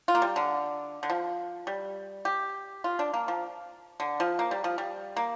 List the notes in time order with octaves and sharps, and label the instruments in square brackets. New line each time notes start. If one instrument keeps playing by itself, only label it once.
[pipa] F4
A#3
G3
D3
D3
F3
G3
G4
F4
D4
A#3
F3
D3
F3
A#3
G3
F3
G3
A#3